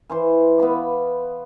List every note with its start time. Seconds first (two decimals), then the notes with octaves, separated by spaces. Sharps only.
0.09 E3 C5 C6
0.58 B3 F5 B5 D6